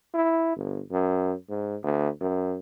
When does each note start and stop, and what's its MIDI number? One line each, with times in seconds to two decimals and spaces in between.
0.14 0.56 64
0.56 0.81 31
0.92 1.33 42
1.49 1.76 44
1.83 2.09 38
2.21 2.58 42